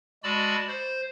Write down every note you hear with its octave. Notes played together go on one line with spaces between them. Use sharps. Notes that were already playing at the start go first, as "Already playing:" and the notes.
G#3 F#4 D5 A5 B5 E6
C5